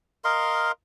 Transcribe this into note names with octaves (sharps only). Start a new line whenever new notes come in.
A#4 D#5 F5 C6